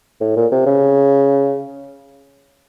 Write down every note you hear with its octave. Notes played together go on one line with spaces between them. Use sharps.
A2
A#2
C3
C#3